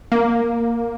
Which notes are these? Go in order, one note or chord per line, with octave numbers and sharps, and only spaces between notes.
A#3